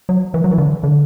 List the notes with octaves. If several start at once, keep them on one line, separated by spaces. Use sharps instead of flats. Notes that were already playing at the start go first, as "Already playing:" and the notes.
F#3
E3
F#3
E3
D3
D3